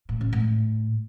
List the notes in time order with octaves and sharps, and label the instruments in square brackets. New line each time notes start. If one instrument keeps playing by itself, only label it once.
[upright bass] A2
C#3
A2